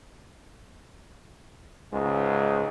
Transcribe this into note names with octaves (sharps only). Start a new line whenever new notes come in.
C#2 G#2 G#3